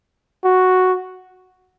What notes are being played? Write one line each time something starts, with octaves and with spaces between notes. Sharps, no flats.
F#4